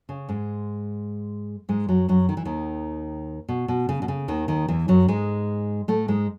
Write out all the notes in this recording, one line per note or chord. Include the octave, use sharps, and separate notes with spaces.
C#3
G#2 G#3
G#2 G#3
F#2 F#3
F#2 F#3
D#3
E3
D#2 D#3
B2
B2
C#3
B2
C#3
D#2 D#3
D#2 D#3
E2 E3
F#2 F#3
G#2 G#3
A2 A3
G#2 G#3